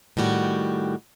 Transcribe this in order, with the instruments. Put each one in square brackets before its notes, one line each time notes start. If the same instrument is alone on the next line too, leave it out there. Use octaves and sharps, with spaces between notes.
[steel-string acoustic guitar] A2 D#3 G3 F#4